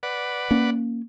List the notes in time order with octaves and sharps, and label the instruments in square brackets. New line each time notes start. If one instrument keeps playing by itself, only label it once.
[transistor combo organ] B4 D5 F#5
[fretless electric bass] A#3 C#4